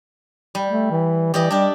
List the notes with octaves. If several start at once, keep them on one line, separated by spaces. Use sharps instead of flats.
G3
A3
E3
E3 G4 D5 D#5
G3 D4 G4